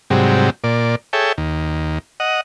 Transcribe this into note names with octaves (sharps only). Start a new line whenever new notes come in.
G#2 C3 F#3 G3
A#2 D5
G#4 A4 C#5 E5 G5
D#2
D#5 F#5